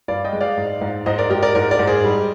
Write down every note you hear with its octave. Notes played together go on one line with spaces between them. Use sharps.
G2 D5 F5
D#5 G5
G#3
D5 F5
G#2
G#2
G#2 C5 D#5
A#4 D5
G#2 G4 A#4
A#4 D5
G#2 A#4 D5
A#4 D5
G#2
G#4 C5
G3